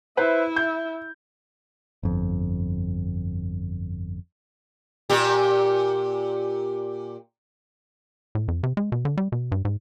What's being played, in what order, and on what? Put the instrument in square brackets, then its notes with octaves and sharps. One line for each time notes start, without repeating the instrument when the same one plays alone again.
[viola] E4 E5 [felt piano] B4 C5
[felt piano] G6
[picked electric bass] G1 F2
[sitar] A#2 G4
[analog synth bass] A2
F2
C3
G#3
B2
D3
G3
B2
G2
G#2